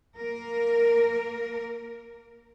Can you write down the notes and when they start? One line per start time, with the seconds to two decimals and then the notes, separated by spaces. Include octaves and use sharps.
0.16 A#3 A#4